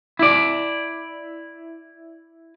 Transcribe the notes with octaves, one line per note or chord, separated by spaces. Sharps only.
E4 D5